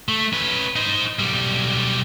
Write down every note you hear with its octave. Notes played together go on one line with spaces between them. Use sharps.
A3
C#4 B4
D#4 C5
B1 G3